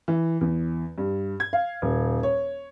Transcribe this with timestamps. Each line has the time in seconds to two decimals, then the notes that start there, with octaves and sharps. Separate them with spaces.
0.08 E3
0.41 E2
0.98 G2
1.40 G#6
1.53 F5
1.82 D#1
2.23 C#5